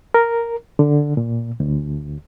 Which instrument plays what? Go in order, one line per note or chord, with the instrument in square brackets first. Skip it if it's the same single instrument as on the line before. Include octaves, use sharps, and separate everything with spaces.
[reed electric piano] A#4
D3
A#2
D2